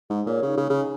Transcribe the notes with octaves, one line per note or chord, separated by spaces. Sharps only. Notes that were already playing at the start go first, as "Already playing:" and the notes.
G#2 G#4
A#2 C#5
C#3 D#4
C#3 G#4
C#3 D#4